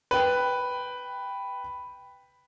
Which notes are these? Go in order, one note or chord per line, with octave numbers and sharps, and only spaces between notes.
B4 G5